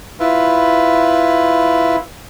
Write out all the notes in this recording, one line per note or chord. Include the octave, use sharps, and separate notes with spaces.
E4 F4 B4